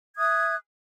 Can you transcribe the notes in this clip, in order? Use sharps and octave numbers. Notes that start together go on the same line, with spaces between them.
E5 D#6 F#6 G#6